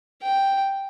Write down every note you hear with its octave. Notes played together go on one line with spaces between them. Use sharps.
G5